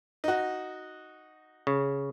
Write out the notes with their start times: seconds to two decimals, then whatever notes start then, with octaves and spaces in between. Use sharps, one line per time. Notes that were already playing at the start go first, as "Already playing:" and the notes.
0.24 D#4 F#4
1.67 C#3